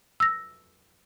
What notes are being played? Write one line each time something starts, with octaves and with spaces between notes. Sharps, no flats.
E6 A#6